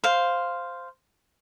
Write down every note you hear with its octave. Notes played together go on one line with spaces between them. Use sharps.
C5 F5